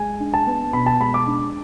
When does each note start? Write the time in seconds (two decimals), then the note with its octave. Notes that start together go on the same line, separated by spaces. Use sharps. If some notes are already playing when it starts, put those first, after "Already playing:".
Already playing: G#3 G#5
0.20 D4
0.34 A5
0.47 B3
0.73 B2 B5
0.86 A5
1.00 G#3 B5
1.14 D6
1.27 D4